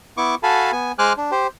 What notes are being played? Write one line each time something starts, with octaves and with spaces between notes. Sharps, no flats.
B3 E4 C#6 D6
F#4 A4 F5 G#5 A5 B5
B3 G#5
G#3 C5 G#5 D6 F6 F#6
D4
G4 C5